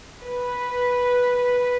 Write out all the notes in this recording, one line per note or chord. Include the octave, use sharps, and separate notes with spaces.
B4